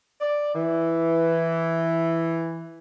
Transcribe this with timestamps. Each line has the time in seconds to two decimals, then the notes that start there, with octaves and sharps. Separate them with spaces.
0.21 D5
0.54 E3